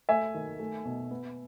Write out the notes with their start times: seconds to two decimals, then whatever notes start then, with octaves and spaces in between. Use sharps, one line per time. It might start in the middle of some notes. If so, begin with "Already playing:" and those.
0.09 A3 E5 G#5
0.35 D#3
0.59 A3
0.85 B2
1.11 B3